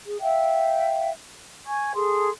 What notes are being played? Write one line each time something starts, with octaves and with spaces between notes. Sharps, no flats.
G#4
E5 F5 G5
G#5 C#6 G#6
G#4 A4 C6